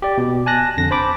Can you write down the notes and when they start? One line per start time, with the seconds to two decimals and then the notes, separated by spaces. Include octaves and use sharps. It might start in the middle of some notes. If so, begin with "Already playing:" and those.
0.02 G4 D5
0.18 B2
0.46 G#5 A5 F#6 A#6
0.77 F2 D3 A#6
0.91 C5 A5 B5 D6